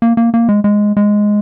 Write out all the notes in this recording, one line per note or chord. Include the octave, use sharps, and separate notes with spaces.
A#3
A#3
A#3
G#3
G#3
G#3